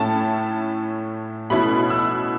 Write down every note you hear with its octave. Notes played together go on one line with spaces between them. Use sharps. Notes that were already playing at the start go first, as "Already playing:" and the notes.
Already playing: A2 A3 C#4 E4 A5
B2 A3 C#4 E4 B5
E6